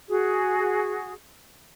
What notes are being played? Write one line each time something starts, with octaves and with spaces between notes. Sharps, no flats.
F#4 G#4